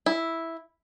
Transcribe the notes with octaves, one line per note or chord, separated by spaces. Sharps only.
E4